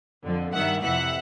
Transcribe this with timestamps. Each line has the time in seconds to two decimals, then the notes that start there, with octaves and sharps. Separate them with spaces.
0.25 F2 D3 F3
0.54 G2 D#3 G3 E5 F#5
0.82 F2 C3 E3 E5 F#5